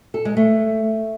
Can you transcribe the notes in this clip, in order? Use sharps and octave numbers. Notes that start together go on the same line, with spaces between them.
A4
G#3
A3